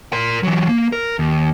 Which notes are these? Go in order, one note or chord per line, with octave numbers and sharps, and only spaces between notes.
A#4 C6
E3 F#3
A#3
A#4
D#2